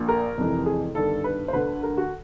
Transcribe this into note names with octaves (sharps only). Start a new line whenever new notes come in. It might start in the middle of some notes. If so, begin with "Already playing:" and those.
Already playing: A#1 A#2
A#4
F1 F2 C3 E3
G#4
G1 G2 D#3 A4
B4
C5
D2 D3 B4
A#4
F#4